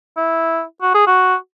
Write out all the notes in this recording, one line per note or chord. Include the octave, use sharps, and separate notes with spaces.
E4
F#4
G#4
F#4